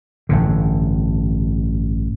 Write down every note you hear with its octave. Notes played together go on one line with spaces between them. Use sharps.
A1 G2 D3